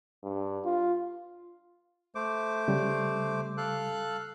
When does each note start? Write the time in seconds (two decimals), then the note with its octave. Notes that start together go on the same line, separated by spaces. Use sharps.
0.23 G2
0.65 F4
2.15 A3 C5 D6
2.68 C#3 G3
3.57 A4 F5 F#6